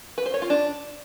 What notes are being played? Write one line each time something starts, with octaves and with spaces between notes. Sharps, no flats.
B4
C5
C#5
F4
D4